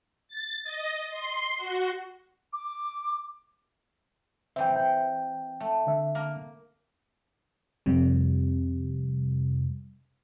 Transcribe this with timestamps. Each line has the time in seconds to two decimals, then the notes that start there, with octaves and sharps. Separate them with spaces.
0.28 A6
0.64 D#5
1.10 C6
1.57 F#4
2.53 D6
4.56 E3 C4 E5 G5
4.76 G5
5.60 A3
5.87 D3 E5
6.15 A#3 A#4
7.86 F2 C3 G3